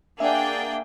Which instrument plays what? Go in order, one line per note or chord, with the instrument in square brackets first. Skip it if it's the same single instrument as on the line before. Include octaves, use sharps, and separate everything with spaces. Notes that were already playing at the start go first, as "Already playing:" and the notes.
[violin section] A#3 G#4 G5 [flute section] D4 [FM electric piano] E5 F#5